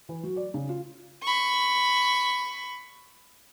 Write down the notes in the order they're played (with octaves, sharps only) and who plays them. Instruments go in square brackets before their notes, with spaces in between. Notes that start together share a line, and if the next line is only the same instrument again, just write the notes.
[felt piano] E3
F#3
D5
C#3
F4
[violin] B5 C#6